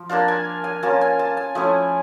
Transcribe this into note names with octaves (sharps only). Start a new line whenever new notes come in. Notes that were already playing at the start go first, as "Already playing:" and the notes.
Already playing: F3
A#3 D4 F4 A5
G#5
G#5
A#3 C#4 F4 A5
G#5
A5
G#5
F3 A3 C#4 E4 G#5